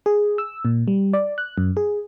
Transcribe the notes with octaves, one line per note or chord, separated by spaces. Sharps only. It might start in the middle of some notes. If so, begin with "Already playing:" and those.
G#4
E6
A#2
G3
D5
F#6
F#2
G#4